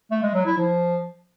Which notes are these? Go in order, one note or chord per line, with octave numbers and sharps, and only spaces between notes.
A3
G#3
F#3
E4
F3